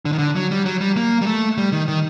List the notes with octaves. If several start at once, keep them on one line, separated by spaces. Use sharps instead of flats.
D3
D#3
D3
F#3
G3
F#3
G3
A#3
G3
A3
G3
D#3
D#3